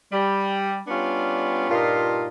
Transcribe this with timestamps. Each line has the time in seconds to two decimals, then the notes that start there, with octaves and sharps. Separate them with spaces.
0.11 G3
0.87 G3 B3 C#4 D4 F4
1.70 G2 A#2 D#4 F4